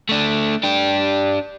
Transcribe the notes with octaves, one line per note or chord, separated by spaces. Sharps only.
A3 D4
D4 G4